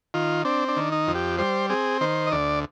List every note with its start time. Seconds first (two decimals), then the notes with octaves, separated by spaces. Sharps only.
0.14 D#3 F4
0.45 C4 D4
0.68 D4
0.76 D#3
0.92 D#4
1.07 F2
1.15 G4
1.38 G3 C5
1.70 C4 G#4
2.01 D#3 C5
2.27 D#5
2.32 D2 D5